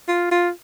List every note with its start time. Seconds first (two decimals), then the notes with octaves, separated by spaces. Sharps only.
0.08 F4
0.31 F4